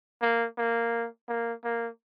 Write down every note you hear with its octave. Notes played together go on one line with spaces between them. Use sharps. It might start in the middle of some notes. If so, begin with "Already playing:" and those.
A#3
A#3
A#3
A#3